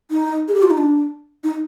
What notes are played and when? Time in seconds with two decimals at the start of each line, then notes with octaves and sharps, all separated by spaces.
0.11 D#4
0.48 G#4
0.54 G4
0.63 F4
0.70 D#4
0.78 D4
1.44 D#4